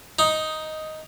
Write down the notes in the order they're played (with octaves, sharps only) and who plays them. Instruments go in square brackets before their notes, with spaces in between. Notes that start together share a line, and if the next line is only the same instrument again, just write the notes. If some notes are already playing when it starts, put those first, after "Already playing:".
[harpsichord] D#4